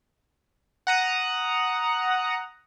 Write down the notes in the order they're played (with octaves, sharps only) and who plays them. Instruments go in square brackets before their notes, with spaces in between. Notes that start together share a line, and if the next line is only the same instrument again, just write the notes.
[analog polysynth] F#5 A#5 D#6